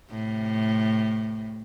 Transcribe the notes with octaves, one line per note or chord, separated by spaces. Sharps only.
A2 C3